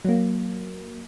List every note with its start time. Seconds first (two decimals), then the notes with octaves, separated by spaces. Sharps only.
0.05 F#3 A#3